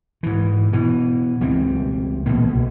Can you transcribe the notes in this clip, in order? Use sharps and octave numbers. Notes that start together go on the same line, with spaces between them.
G#2 E3
B2 E3
C#2 E3 G3 C4
A#1 B2 E3 A#3
B1